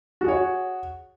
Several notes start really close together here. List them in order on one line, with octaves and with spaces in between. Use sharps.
F#4 G#4 C#5